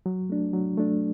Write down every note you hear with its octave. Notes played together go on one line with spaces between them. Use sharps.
F#3
A3 D4
F#3
A3 D4